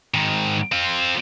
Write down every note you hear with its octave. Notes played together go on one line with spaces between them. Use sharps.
G#2 D#3
C4 F4